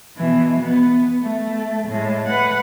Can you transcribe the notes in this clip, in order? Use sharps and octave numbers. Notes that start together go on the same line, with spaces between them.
B2 E3
B3
A3
A2 G#3
B4 F#5